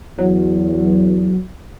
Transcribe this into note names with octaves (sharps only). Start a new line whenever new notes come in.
E2 F#3